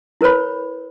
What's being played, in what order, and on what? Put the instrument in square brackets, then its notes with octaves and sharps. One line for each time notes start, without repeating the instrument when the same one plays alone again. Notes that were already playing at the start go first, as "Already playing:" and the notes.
[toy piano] E4 A#4 B4 C#5 B5